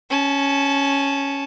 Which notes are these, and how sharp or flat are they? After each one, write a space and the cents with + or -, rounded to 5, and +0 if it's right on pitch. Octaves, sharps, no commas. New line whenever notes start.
C#4 +0 A5 -20